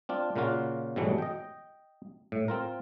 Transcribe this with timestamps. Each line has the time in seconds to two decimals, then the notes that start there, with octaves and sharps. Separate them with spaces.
0.09 C4 D4 F4
0.36 A#2 C#3 A#3 F4 F#4
0.96 G#2 B2 E3 F#3 G3 A3
1.18 D#5 G5
2.32 A2
2.48 C4 F4 A#4